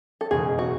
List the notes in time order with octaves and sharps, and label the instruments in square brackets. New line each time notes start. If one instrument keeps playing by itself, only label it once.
[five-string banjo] A4
[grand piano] F#1 E2 B2 G#3 D#4 [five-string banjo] G#4
[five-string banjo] F#4